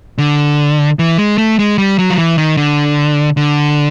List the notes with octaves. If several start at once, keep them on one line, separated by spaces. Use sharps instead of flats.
D3
E3
G#3
A3
G#3
G3
F#3
F3
E3
D#3
D3
D3